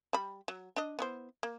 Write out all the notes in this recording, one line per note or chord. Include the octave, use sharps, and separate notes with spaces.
G3 B5
F#3
D4 D#5
B3 E4 C5
A#3